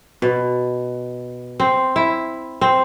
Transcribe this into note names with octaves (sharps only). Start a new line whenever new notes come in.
B2
C4
E4
C4